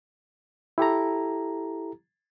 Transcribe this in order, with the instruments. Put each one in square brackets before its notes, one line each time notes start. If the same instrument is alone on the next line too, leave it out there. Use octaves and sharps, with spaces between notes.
[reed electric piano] E4 G4 A4 A#5